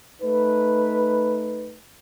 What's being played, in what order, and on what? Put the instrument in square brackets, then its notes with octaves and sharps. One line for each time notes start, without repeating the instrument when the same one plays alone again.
[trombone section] A3 D#4 B4